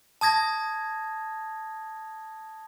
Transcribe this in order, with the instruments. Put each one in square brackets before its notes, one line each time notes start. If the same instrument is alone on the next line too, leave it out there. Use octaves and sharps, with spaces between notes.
[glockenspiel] A5 D#6 G#6 A#6